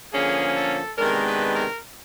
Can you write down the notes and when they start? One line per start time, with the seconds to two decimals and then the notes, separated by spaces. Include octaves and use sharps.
0.13 D3 F3 A#3 C#4 G#4
0.56 A4
0.97 C3 D#3 G#3 B3 D4 A#4
1.26 B4
1.54 A#4